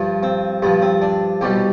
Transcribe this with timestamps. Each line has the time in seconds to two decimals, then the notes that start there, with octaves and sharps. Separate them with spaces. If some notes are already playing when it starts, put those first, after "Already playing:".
Already playing: G2 F3
0.23 C4
0.62 G2 F3 B3
0.82 C4
1.02 D4
1.41 C2 B2 G3 G4